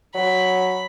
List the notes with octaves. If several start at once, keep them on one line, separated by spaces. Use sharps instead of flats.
F#3 B5